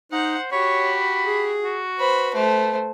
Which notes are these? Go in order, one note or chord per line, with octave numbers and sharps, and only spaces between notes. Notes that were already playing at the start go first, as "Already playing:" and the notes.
D#4 C5 F#5
F#4 G4 C#5 B5
G#4
F#4
B4 C5 B5
A3 C5